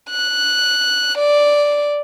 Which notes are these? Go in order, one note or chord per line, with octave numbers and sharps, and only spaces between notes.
F#6
D5